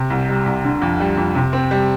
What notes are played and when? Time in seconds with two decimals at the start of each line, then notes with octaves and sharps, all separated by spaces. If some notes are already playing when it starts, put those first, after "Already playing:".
Already playing: C3
0.10 C2
0.29 G3
0.46 C2
0.64 D3
0.82 F2
1.00 G3
1.17 F2
1.35 C3
1.53 C4
1.71 G3